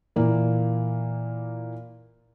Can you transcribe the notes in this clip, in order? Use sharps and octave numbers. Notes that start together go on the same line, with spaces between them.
A#2 E3 A#3